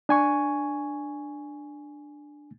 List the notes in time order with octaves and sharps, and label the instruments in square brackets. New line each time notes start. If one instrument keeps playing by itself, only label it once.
[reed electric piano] D4 G#5 C#6